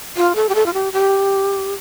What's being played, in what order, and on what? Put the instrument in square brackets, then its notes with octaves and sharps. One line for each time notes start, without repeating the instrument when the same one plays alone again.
[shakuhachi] F4
A4
G4
A4
F4
G4
G4